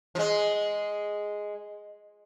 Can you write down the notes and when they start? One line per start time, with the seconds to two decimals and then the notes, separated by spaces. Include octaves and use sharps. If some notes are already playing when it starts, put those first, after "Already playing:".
0.15 F3
0.19 G#3